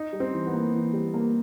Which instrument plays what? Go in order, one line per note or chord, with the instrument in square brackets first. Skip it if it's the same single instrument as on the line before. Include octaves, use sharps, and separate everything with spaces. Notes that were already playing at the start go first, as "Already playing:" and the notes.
Already playing: [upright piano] D#4
[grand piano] G3
[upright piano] C4
[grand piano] E3
[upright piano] B3
[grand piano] A#3
E3
G3
A#3